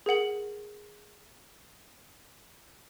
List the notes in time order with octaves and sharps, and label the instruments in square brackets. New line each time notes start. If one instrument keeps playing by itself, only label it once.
[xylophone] G#4 A#4 F#5 F#7